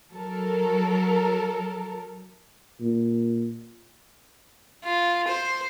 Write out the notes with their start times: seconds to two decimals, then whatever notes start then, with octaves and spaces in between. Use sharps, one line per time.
0.13 F#3 A4 A#4
2.80 A#2
4.84 F4
5.28 C5